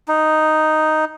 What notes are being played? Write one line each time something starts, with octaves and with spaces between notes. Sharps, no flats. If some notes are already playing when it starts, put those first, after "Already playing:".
D#4